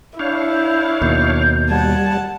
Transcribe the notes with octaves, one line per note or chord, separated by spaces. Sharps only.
D4 E4 C#5 F5 G6
D#2 B2 G6
G3 F#5 A5 G#6